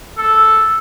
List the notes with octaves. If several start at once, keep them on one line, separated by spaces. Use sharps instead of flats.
A4